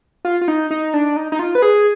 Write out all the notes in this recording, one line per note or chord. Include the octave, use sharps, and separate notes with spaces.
F4
F4
D#4
D#4
D4
D#4
D#4
F4
B4
G#4